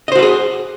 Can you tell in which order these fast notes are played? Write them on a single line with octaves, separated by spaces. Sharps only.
D#5 C5 F#4 B4 G#4